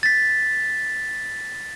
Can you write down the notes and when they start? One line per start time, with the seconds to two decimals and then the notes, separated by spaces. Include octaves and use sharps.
0.03 A6 B6